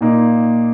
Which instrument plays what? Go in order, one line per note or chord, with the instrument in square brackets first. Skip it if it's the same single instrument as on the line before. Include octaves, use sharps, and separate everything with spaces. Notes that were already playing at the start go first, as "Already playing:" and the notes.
[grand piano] A#2 A#3 D#4